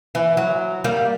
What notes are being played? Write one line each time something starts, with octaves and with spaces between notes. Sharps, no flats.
E3
F#3
G3 A#3